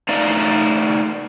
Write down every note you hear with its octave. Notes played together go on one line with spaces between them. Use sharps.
A3 D#4 D5 F5